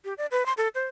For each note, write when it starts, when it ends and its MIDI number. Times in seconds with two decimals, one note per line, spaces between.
0.05 0.14 67
0.18 0.26 74
0.31 0.46 71
0.46 0.53 84
0.57 0.68 69
0.75 0.86 72